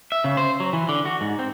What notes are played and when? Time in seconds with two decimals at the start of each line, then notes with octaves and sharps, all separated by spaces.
0.12 E5
0.24 C#3
0.37 C5
0.60 F#3
0.73 E3
0.89 D3
1.05 F#4
1.21 G#2
1.39 C4